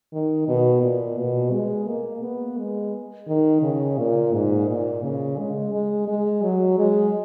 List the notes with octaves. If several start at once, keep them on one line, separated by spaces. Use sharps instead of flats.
D#3
B2
A#2
B2
G#3
A#3
B3
G#3
D#3
C#3
A#2
G#2
A#2
C#3
G#3
G#3
G#3
F#3
G#3